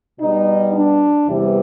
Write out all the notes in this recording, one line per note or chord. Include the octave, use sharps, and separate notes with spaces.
B2 G3 D#4
D4
E2 C3 E3 G3